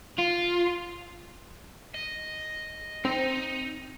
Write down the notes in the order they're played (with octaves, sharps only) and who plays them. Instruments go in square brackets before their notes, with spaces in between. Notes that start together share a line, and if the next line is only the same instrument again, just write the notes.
[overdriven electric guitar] F4
D#5
[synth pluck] C4 [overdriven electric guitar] D#4